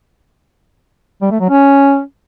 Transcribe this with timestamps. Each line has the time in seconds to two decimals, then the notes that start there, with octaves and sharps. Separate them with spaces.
1.22 G3
1.31 A3
1.40 F#3
1.50 C#4